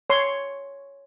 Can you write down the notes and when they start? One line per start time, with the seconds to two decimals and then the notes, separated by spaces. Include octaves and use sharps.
0.10 C#5 C6